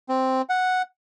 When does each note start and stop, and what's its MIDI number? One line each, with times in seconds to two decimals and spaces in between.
0.09 0.42 60
0.49 0.82 78